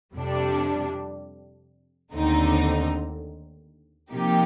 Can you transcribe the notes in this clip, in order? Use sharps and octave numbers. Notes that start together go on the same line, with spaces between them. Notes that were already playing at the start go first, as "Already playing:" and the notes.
F2 C3 G3 D4
D#2 D3 A3 C4 D#4
C3 F3 A#3 D#4 G4